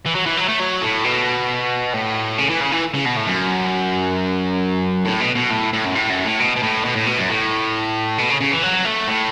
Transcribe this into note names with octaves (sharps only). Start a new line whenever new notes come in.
E3
F#3
E3
F#3
A3
F#3
A2
B2
A2
C#3
E3
C#3
E3
C#3
B2
A2
F#2
A2
B2
B2
A2
A2
F#2
A2
F#2
A2
B2
B2
A2
B2
A2
B2
F#2
A2
B2
C#3
C#3
E3
F#3
A3
A2